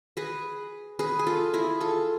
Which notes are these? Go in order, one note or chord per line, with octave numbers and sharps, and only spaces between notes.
G#4 B4
G#4 B4
G#4
F4 A4
E4 G#4
F4 A4